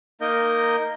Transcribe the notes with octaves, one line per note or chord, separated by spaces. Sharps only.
A#3 D#4 A#4 D#5 G6